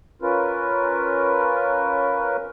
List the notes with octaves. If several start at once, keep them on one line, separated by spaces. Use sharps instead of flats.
C#4 F4 A#4 B4